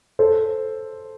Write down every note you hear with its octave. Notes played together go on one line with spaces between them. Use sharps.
A4 C5